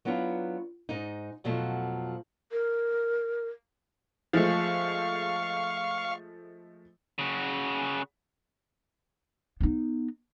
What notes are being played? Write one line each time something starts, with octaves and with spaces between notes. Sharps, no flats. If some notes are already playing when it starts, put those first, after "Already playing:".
F#3 B3 D4 E4 F4
G#2 D#4
F2 B2 F3 F#3 A3
A#4
F3 G#3 A3 F5 C#6
C#3 F#4
B3 D#4